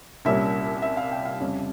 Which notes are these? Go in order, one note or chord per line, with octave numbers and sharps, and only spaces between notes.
C2 A#2 G3 A#3 C#4 E5
E5
F5
G5
F5
F2 C#3 G3 C#4